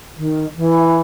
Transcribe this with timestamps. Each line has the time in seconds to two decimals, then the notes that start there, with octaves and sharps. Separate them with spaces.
0.17 D#3
0.56 E3